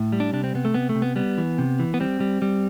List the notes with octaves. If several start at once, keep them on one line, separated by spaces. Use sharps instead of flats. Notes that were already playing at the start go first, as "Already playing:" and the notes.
Already playing: A2
G3
D4
C3 D4
C4
C3 B3
A3
C3 B3
A3
C3
B3
G3 B3
E3
C3
E3
B3
G3 C4
G3
G3